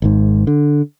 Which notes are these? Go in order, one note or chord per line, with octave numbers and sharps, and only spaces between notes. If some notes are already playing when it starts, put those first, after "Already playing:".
G#1 G#2
D3